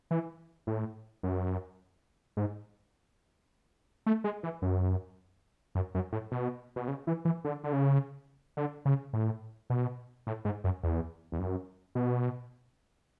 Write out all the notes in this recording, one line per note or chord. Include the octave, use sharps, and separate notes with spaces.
E3
A2
F#2
G#2
A3
G#3
E3
F#2
F#2
F#2
A2
B2
B2
C#3
E3
E3
D3
D3
C#3
D3
C#3
A2
B2
A2
G#2
F#2
E2
E2
F#2
B2